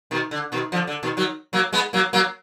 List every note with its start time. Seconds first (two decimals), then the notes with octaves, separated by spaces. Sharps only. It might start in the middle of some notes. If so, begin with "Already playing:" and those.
0.11 B2 D#3
0.31 D3
0.52 B2 D#3
0.72 D3 F3
0.87 D3
1.03 B2 D#3
1.17 D#3 F#3
1.53 F#3 A#3
1.73 G#3 B3
1.93 F#3 A#3
2.13 F#3 A#3